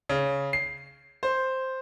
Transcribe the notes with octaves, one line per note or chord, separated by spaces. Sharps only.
C#3
C7
C5